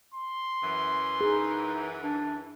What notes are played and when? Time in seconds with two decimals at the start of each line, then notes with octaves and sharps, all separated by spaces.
0.14 C6
0.62 F#2 E3
1.21 D#4 G#4
2.02 D4